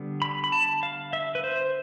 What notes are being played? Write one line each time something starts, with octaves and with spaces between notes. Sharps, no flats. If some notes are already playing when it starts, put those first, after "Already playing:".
Already playing: D3 G3 B3
B5
B5
A5
F5
E5
B4
C5